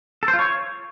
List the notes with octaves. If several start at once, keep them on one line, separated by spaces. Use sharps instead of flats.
A4
C5
F4
C#5